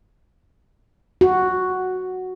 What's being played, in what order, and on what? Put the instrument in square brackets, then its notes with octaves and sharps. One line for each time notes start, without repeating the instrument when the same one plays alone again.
[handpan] F#4